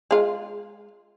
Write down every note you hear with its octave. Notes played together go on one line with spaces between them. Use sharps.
G#3 F4